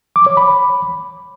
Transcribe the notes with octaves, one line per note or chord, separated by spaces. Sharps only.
D6
C#5
B5